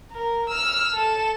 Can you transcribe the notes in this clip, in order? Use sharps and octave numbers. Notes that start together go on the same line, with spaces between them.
A#4
E6 F6
A4 E7